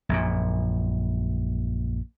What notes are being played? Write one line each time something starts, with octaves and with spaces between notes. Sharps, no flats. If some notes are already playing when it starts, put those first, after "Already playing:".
A#1 F#2 A#2